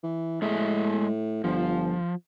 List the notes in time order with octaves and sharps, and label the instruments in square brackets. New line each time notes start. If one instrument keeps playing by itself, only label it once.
[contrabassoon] E3
[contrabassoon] A2 [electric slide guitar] G#3 G#4 E5
[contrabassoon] G1 [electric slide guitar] F3